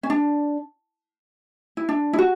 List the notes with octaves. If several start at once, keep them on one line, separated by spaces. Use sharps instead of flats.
C#4
D4
E4
D4
E4
F#4